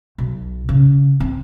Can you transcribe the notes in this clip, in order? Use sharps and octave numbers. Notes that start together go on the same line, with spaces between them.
B1
C#3
C4